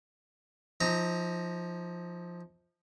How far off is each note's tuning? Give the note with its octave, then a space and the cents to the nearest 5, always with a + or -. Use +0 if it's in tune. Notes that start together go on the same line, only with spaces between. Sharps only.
F3 +0 D#4 +35 A#5 -15